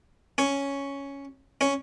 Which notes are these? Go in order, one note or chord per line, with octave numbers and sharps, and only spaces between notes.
C#4 C#5
C#4 C#5